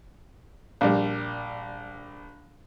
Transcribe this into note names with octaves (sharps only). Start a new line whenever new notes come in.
A#1 G3